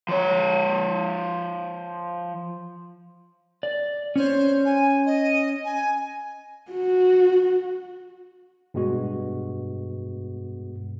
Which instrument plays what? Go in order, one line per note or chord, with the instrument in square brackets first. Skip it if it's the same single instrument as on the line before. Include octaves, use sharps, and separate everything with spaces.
[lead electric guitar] F3 C#5
[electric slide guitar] D5
[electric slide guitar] C#4 C#5 [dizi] C5
[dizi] G#5
D#5
G#5
[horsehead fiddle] F#4
[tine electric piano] G2 B2 G#3 B3 F#4